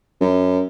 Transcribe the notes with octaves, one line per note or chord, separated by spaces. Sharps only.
F#2